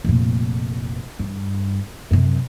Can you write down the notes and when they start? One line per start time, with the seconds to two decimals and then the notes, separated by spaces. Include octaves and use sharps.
0.04 F1 A#2
1.19 G2
2.11 F#2 C3